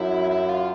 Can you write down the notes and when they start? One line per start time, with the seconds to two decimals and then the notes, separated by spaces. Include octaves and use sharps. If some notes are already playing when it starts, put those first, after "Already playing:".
Already playing: F#2 E4
0.31 E4
0.49 F4